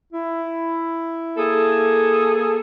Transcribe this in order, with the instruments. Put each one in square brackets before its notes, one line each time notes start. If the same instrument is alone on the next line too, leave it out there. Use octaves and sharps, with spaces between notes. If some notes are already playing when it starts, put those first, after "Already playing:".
[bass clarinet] E4
[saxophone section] A#3 G#4 A4